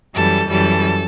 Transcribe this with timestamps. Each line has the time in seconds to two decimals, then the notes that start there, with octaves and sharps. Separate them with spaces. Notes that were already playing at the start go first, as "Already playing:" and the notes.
0.15 F#2 E3 G3 A4
0.49 F#2 E3 G3 A4